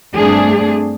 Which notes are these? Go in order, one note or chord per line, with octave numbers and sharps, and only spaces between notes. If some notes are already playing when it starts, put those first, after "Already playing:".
G2 A3 C4 D4 G#4